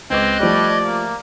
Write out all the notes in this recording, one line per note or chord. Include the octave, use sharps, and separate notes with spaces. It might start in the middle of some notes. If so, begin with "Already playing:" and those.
C#2 C4 B4 D#5 D6 F#6 G#6
F3 G3 A3 G4 D5
A#3